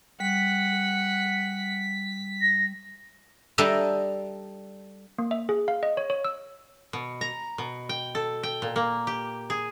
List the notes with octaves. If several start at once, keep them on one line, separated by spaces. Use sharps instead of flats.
G3 F#5 B6
A#6
G3 D4 A4 D#5 E5 A#5
A#3
E5
G#4
F5
D#5
C#5
C#5
E6
B2
A#5
B2
G5
A4
G5
A#2
A#3
G4
G#4